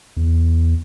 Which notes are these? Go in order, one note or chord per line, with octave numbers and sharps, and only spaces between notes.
E2